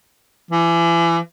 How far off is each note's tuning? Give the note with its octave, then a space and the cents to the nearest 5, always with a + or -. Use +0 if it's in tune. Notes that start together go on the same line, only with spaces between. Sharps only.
E3 +35